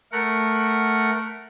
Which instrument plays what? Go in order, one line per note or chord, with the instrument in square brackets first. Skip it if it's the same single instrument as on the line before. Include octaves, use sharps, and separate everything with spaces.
[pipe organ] A3 A#4 F#5